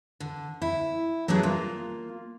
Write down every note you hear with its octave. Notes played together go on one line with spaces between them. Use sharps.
D3
E4
F#3 G3 B3 C#4 D4 G#4
A#3 F4